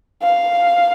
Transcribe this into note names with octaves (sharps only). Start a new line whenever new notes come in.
F5